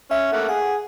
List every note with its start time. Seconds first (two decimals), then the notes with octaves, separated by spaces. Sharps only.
0.11 C#4 E5
0.32 A3 A#3 F#5
0.49 G#4 F#5